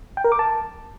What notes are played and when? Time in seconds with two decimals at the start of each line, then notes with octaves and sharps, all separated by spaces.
0.17 G5
0.24 A#4
0.32 D6
0.39 A5